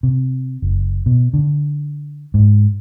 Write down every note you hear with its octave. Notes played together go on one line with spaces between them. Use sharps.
C3
F#1
B2
D3
G#2